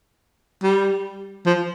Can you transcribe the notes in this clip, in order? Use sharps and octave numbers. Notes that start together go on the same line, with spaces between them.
G3
F3